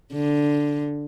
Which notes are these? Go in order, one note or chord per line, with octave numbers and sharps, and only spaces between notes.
D3